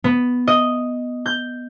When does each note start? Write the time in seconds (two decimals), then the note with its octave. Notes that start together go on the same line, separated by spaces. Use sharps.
0.04 B3
0.47 D#5
1.26 G6